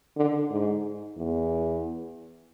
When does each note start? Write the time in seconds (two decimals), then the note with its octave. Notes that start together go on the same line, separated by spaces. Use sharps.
0.16 D3
0.50 G#2
1.17 E2